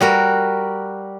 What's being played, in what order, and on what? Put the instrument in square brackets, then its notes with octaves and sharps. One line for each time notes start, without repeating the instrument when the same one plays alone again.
[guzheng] G3 F#4 A#4